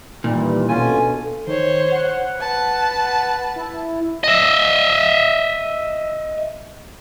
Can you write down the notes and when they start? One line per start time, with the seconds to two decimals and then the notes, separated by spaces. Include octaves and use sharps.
0.24 A#2 D#3 E3 G3
0.69 B2 D3 C#4 F4 G#5
1.47 D#3 C5 C#5
1.92 F#5
2.37 B4 A5
3.56 E4
4.24 D#5 E5